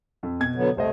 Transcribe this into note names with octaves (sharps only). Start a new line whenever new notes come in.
F2
B2 G#6
D3 F#3 B3
C2 A3 C5 D#5